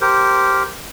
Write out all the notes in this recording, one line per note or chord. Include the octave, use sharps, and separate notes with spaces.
G4 A#4 C5